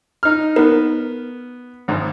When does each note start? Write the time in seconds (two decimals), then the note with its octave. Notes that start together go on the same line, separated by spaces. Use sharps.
0.23 D#4 F6
0.56 B3 D#4 A#4
1.88 G#1 G#2